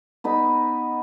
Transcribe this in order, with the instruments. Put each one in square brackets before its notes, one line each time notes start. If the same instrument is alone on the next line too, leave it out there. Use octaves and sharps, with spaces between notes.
[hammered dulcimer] B3 D#4 B5